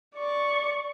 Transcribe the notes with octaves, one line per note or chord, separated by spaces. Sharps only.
D5 C#6